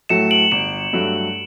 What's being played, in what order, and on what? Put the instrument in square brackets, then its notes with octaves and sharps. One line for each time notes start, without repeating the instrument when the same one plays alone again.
[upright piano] A2 F#3 A3 [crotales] C#7 E7
[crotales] D7 F#7
[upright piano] G1 [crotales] C#7 E7
[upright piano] G2 F#3 A3